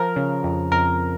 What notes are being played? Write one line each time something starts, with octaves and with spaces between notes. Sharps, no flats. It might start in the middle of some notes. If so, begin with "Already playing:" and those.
Already playing: F3 A#4
C#3
F2
F2 A#4